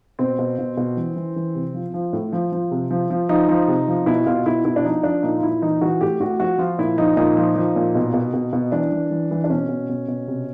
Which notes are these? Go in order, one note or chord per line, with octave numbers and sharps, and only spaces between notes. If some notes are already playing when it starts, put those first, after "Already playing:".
B2 C4
B2
B2
B2
E3
E3
E3
C3
F3
F3
A2
F3
F3
C3
F3
F3
F3 D#4
F3
C3
F3
B2 E4
B2 F4
B2 E4
B2 E4
D4
F3 D#4
F3 D4
A#2 D#4
F4
A#2 E4
E3 D#4
E3 F#4
A2 G4
A2 F#4
F3 F#4
F3 F4
A#2 E4
F3 D#4
A#2 D#4
F3
F3
A#2
B2
B2
B2
B2
E3 D4
E3
E3
E3
D4
B2 C#4
B2
B2
B2
C3